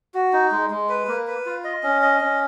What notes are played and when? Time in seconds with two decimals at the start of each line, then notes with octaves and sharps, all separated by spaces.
0.14 F#4
0.33 D#4
0.51 G#3
0.71 G#3
0.89 B4
1.08 A#3
1.27 B4
1.46 F4
1.64 D#5
1.83 C#4
2.02 D#5
2.21 C#4